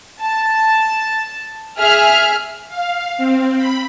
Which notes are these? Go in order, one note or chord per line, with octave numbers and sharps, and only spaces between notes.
A5
G#4 E5 F6
F5
C4
B5